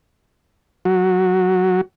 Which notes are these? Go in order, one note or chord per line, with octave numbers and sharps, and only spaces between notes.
F#3 F#4